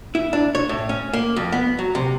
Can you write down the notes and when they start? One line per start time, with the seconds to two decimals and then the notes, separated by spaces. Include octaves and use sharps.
0.15 E4
0.33 D4
0.55 C#5
0.69 A2
0.89 C#4
1.13 A#3
1.36 F2
1.52 B3
1.79 F#3
1.95 C3